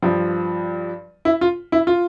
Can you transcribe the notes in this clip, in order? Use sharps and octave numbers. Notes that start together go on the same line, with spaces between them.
G2 F3
E4
F4
E4
F4